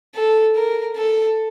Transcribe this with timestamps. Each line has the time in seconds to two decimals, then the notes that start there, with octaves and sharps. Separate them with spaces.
0.15 A4
0.56 A#4
0.96 A4